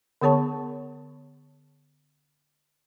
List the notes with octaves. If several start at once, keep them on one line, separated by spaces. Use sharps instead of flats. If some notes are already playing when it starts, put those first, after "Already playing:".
D3 B3 G#4 C#5 A5 C#6